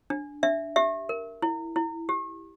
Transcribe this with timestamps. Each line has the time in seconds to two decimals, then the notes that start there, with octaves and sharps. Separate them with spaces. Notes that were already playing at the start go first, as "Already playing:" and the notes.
0.10 D4
0.43 D4 E5
0.76 G4 E5
1.09 A#4
1.42 E4
1.76 E4
2.09 G4